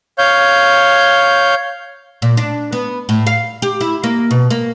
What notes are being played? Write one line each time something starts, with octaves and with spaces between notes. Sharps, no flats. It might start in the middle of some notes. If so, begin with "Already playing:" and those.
C#5 F5 G6
A#2
D4
B3
A2
F5
G4
E4
A#3
B2
A#3